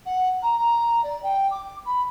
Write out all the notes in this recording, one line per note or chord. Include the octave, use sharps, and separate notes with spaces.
F#5
A#5
A#5
D5
G5
D6
B5